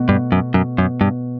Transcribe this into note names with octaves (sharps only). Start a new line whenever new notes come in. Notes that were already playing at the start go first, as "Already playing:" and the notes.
Already playing: B2 A3
G2
F#2
F#2
F#2
G2